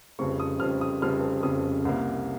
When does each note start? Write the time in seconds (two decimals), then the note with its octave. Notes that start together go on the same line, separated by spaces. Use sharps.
0.19 F1 F2 C#3 G3 C4 C#6
0.40 D#6
0.60 F1 F2 C#3 G3 C4 F6
0.81 D#6
1.02 F1 F2 C#3 G3 C4 F6
1.43 F1 F2 C#3 G3 C4 D#6
1.85 C2 C3 G3 A#3